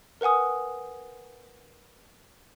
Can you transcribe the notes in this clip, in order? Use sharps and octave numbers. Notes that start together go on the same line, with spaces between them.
A#4 B4 F#5 G#5 D#6